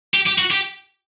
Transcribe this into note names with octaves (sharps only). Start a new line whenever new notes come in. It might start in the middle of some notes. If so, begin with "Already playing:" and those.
G4
G4
F#4
G4